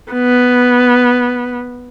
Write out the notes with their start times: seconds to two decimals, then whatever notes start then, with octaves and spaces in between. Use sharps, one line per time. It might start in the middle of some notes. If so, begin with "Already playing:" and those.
0.12 B3